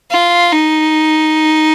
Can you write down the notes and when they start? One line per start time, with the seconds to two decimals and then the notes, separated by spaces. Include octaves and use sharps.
0.11 F4
0.52 D#4